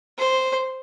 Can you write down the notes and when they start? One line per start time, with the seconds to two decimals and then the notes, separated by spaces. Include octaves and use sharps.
0.18 C5